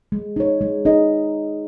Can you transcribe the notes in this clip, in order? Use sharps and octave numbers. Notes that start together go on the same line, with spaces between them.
G#3
D#4 C#5
G#3
D#4 G#4 D#5